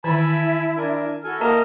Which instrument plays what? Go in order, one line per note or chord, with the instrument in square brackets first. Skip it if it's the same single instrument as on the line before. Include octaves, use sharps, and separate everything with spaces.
[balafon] D#3 E3 [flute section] E4 [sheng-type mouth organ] G#5 A5 B5
[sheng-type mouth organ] D4 A#4 G#5
[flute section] E4 F#4 F6 [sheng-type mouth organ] A4 G#5
[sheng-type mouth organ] A#3 D#5 [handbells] A#4 A5 A#5